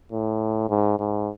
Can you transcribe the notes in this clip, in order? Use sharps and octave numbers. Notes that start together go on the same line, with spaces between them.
A2
G#2
G#2